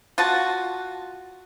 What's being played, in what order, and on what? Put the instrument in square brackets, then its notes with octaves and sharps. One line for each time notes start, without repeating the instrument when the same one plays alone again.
[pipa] F4 F#4 A5